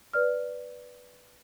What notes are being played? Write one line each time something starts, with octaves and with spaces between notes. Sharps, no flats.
B4 D5 F6